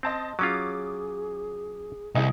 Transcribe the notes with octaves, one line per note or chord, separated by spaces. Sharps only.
C4 D#5 A5 C6
F#3 C#4 F4 G#4 D6 D#6
C2 E4 G#4 D#5